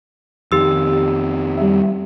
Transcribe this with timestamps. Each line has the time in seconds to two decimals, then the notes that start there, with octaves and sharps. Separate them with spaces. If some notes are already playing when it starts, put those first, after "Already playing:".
0.52 F2 D#3 G4 E6
1.57 G3 E5